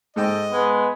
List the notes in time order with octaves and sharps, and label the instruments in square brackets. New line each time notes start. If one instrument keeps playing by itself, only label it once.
[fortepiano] G#2 G5 [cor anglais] A4 [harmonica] D#5
[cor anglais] G#3 [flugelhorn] B3